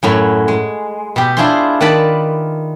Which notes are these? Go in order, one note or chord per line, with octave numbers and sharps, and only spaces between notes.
F#2 A2 F#3
G#3
B2 G4
D4 E4 F4 G#4 C5 C6
D#3 B4 D5 A5 B5